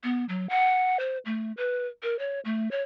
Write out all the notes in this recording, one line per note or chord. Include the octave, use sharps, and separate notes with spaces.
B3
F#3
F#5
C5
A3
B4
A#4
C#5
A3
C#5